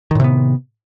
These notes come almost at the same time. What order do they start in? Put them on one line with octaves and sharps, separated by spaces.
D#3 A2 C3 B3